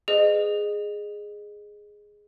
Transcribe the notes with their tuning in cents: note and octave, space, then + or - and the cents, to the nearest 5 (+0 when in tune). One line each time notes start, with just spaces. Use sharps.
G#4 +0 B4 +40 D#5 -25